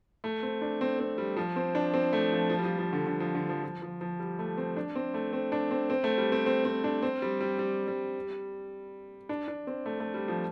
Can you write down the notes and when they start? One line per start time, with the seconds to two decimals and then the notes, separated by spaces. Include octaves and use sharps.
0.24 A3
0.43 C4
0.62 D4
0.81 C4
0.99 C4
1.18 G3
1.37 F3
1.56 C4
1.75 D4
1.94 C4
2.13 A3
2.32 F3
2.50 F3
2.58 G3
2.64 F3
2.79 F3
2.93 D3
3.07 D3
3.20 F3
3.35 D3
3.49 F3
3.64 F3
3.82 F3
4.01 F3
4.20 G3
4.39 A3
4.58 C4
4.76 D4
4.95 C4
5.14 A3
5.33 C4
5.52 D4
5.71 C4
5.90 C4
6.04 A3
6.18 G3
6.32 C4
6.46 C4
6.65 C4
6.84 D4
7.02 C4
7.22 G3
7.41 G3
7.59 G3
7.88 G3
9.29 D4
9.48 D4
9.67 C4
9.86 A3
10.00 A3
10.14 G3
10.28 F3